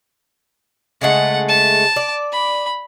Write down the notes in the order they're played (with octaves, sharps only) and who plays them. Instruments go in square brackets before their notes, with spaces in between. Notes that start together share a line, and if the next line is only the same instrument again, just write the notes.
[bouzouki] C#3 G#3 A3 [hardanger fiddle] F#5
[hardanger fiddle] A5
[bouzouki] D5
[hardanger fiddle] B5